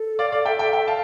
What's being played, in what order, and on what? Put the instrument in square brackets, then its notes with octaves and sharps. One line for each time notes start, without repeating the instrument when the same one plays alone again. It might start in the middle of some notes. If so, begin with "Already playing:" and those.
Already playing: [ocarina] A4
[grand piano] D5 F5
D5 F5
E5 G5
E5 G5
E5 G5
F5 A5